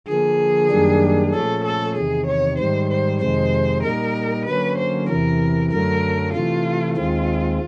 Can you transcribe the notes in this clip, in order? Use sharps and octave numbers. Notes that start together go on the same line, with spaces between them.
D3 F3 A#3 G#4
F#2 D#3 G3 A#3 D4
A#2 F3 A3 C#4 A4
A4
E2 C3 D#3 G#4
C#5
G#2 D#3 G3 C5
C5
F2 C3 D#3 G#3 C5
A#2 G3 A#3 D#4 A#4
D3 F#3 A#3 C#4 B4
C5
E2 C3 E3 A#4
F#2 D3 F#3 A3 A#4
C3 E3 A3 F4
D#2 D#3 G#3 C4 F4